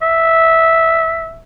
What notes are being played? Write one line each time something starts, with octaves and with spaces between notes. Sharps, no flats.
E5